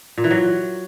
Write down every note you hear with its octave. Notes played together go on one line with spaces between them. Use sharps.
A#2
E3
F#3